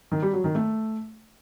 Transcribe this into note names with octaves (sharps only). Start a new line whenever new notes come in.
D#3
G3
F#3
D#3
A3